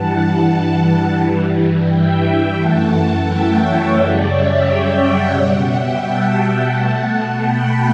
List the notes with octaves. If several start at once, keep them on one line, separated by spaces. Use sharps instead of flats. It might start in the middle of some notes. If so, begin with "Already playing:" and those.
Already playing: G2 E3 G3 F#5 A5
G2 E3 G3
E5 G5
F#2 E3 A3 F#5 A5
E5 G5
C#5 E5
F#2 C#3 G3 B4 D5
C#5 E5
E5 G5
D5 F#5
B2 G3 D5 F#5
E5 G5
F#5 A5
B2 A3 F#5 A5
G5 B5